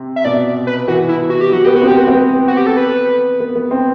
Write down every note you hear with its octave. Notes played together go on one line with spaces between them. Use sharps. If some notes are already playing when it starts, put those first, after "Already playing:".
Already playing: C3
E5
B2 D5
B4
E3 F#4
E4
F#4
G4
F#3 F#4
B3 G4
B3 F#4
C4
G4
B3 F#4
C4
B3
F#4
G4
A4
B4
B3
B3
C4